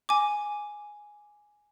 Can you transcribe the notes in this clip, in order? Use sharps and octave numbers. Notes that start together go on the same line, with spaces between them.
G#5 D6